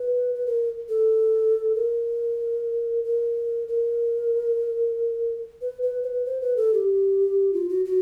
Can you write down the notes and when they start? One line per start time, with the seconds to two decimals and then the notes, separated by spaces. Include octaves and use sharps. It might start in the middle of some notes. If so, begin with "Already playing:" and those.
Already playing: B4
0.35 B4
0.46 A#4
0.89 A4
1.75 A#4
3.04 A#4
3.68 A#4
5.61 B4
5.82 B4
6.03 C5
6.07 B4
6.25 C5
6.41 B4
6.57 A4
6.74 G4
7.53 F4
7.69 F#4
7.85 F#4